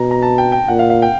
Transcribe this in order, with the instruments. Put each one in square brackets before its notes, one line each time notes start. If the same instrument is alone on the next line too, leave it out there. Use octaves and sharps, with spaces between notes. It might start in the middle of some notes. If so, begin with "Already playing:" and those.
Already playing: [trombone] B2 [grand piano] A#5
[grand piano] A#5
A5
G5
G5
[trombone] A#2 [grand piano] F#5
[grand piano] F5
F5
G5